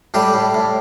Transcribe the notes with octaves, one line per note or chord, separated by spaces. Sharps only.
A2 G3 G4
A2
A2